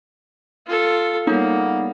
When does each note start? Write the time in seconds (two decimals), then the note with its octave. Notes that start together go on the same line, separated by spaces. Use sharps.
0.67 F4 A4
1.27 C#3 G3 A#3 B3 D#4